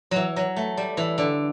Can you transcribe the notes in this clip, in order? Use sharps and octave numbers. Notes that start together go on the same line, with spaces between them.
E3 F#3
F#3
A3
G3
E3
D3